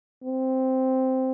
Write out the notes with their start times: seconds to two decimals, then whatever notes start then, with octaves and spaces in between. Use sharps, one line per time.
0.24 C4